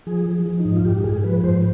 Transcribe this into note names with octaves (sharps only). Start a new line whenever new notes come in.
F3 G#4
F3
F3
D#4
G#2
F4
G#2 G4
G#2 G#4
F3 B4
G#2 C5